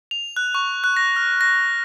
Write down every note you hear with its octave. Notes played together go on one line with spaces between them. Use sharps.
F7
F#6
C#6
F#6
A#6
F6
A#6